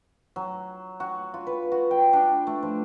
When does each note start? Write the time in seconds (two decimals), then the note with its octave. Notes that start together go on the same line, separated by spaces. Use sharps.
0.36 F#3
1.00 F#4
1.34 F4
1.47 B4
1.72 F#4
1.91 G5
2.13 D4
2.47 A3
2.63 F3